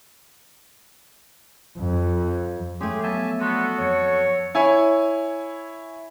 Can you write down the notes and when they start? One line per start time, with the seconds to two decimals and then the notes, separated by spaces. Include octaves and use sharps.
1.78 F2
2.81 A3 C#4 G4 G#4 C6
3.03 F3 F#3 B3 E5 G#5 A5
3.41 G3 B3 F#4 A4 C6
3.79 F2 C#5
4.55 E4 C#5 G#5